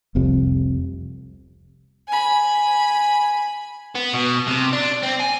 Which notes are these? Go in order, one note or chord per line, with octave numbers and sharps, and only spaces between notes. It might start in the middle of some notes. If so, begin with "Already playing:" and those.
F1 C2 F2 C3
G#5 B5
B3
B2
C3
D4
C4
G#5